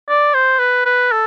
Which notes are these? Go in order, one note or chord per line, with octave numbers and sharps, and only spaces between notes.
D5
C5
B4
B4
A4